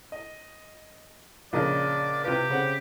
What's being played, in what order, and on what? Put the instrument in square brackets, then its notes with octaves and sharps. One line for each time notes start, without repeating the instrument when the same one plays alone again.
[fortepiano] D#5
[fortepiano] A#1 C#3 D#5 [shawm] D5
[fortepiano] C3 F4 B4 [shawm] G4
[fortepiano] C#3 C4 F#5